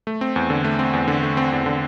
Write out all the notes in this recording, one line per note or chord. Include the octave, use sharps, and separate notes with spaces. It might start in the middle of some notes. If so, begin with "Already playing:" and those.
A3
C4
E2
D3
A3
C4
E2
D3
A3
C4
E2
D3